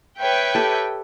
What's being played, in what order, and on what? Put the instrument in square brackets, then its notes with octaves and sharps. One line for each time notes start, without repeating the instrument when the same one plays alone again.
[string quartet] B4 C#5 E5 [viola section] G5
[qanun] G4 A4